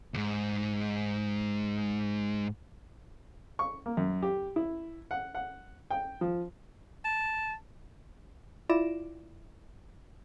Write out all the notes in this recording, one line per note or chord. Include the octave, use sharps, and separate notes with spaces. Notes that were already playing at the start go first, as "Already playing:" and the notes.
D#2 G#2
C#6
A#3
F#2
G4
E4
F#5
F#5
G5
F3
A5
E4 F4 D5 A#6 D7 E7